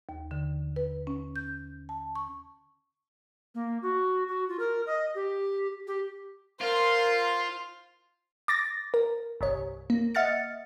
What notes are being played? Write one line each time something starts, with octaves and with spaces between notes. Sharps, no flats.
D#2
D3
B4
C#4
G6
A5
C#6
A#3
F#4
F#4
F4
A#4
D#5
G4
G4
F4 A#4 C5 C6
D6 A6 A#6
A#4
G1 C2 C#5
A#3
D#5 E5 F#5 F6 A6 C#7